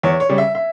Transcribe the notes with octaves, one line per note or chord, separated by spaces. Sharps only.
E2 C#5
C#5
C#3 G3
E5
E5